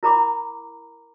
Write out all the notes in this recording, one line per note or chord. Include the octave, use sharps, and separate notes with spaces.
E4 A#4 A#5 B5 D6